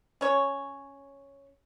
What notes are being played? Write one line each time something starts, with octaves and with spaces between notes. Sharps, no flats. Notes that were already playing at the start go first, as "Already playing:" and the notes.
C#4 C#5